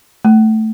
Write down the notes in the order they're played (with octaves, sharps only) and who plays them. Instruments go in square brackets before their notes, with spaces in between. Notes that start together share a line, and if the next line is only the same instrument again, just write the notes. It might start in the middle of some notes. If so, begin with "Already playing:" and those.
[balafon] A3